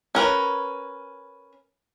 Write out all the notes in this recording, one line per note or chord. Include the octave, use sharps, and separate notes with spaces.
C#4 A#4 B4